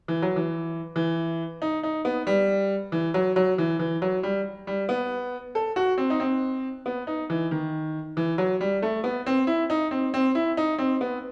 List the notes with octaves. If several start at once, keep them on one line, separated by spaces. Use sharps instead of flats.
E3
F#3
E3
E3
D#4
D#4
B3
G3
E3
F#3
F#3
E3
E3
F#3
G3
G3
B3
A4
F#4
C4
D#4
C4
B3
D#4
E3
D#3
E3
F#3
G3
A3
B3
C4
E4
D#4
C4
C4
E4
D#4
C4
B3